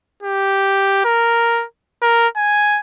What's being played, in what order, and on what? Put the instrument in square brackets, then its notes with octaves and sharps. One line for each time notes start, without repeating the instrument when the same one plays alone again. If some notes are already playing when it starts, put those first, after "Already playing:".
[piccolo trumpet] G4
A#4
A#4
G#5